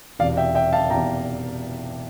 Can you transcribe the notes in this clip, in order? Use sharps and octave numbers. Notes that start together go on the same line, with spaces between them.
E1 E2 C3 D5 F5
E5 G5
E5 G5
F5 A5
E1 E2 C3 G5 A#5